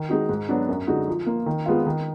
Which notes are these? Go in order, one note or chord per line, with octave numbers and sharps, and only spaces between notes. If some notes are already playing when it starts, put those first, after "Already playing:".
Already playing: D#3
G#3 D#4 F#4
G#2
F#3 B3 D4 F#4
F#2
D3 G#3 D#4 F#4
F3
A#3 F4
D#3
G#3 B3 F4
D#3